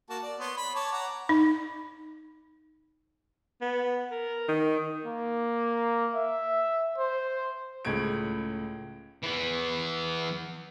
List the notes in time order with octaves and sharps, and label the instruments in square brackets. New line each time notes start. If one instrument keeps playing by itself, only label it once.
[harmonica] A#3 F#4 A5
D5
B3 C#5 C6
B5
C#5 A5 D6
F#5 A#5 D6
[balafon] D#4
[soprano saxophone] B3
A#4
[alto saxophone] D#3
[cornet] A#3
E5
C5
[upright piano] C#2 A2 G#3 G#6 D7
[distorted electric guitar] E3 B3